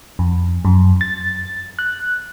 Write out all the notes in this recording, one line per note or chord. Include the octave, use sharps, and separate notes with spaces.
F2
F#2
A6
F#6